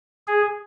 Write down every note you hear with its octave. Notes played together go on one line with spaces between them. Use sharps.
G#4